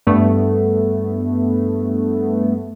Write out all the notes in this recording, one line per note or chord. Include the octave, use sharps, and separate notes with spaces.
G2 A3 B3